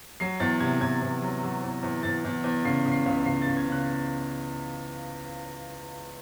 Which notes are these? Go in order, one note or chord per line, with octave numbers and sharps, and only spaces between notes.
F#3 C7
E2 A6
C3 G#6
E2 G#6
E2
F#3
F#3
E2
E2
E2 A6
E2
E2
C#3 C7
C#3
C7
C#2
C#2 C7
C#3 A6
G#6
C#3 F#6